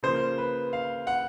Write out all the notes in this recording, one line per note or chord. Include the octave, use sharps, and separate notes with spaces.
C#3 F3 A#3 C5
B4
F5
F#5